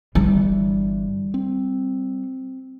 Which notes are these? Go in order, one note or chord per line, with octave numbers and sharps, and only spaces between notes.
G1 E3 G3
C4